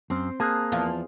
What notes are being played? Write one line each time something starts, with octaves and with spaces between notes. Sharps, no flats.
F#2 C4 C5
A#3 G#4 A5 D#6 F#6
E2 F3 F5